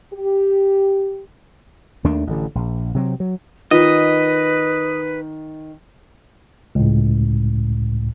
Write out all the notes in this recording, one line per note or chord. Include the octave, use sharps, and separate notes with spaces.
G4
D#2 D#3 A3 D4
A1 D3
A#1
C3 F#3 C4
F#3
D#3 F4 B4 D#5
C#2 A2